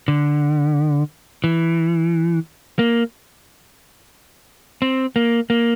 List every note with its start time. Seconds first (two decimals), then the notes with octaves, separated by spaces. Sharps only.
0.08 D3
1.44 E3
2.79 A#3
4.82 C4
5.16 A#3
5.50 A#3